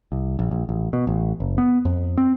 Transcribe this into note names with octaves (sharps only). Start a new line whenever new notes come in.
C2
A#1
A#1
A1
B2
A1
F#1
B3
F2
C4